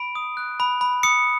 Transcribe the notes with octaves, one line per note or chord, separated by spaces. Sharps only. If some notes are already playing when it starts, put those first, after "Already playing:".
Already playing: B5 D7
D#6
F#6
B5
B5
D#6 C#7